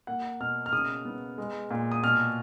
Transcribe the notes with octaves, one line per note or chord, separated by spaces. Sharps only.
A#3 F#5
B2 F6
F6
C#3 D#6
B3
G#3
A#2
D#6
B2 F6